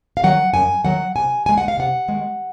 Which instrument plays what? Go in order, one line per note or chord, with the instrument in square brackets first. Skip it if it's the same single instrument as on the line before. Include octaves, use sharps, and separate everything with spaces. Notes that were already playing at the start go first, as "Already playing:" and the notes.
[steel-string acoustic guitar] F5
D#3 F#3 F#5
F#2 G#5
D#3 F#3 F#5
C3 G#5
D#3 G#3 G#5
F#5
F5
C3 F#5
D#3 G#3